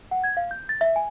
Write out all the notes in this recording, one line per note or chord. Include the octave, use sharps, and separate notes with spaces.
F#5
G#6
F5
G6
A6
E5
G#5